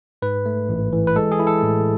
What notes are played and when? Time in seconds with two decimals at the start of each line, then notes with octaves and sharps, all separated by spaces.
0.22 G#2 B4
0.46 A3
0.69 A1
0.93 E3
1.07 B4
1.16 G#3 A4
1.32 G#4
1.39 E4
1.47 A4
1.63 A2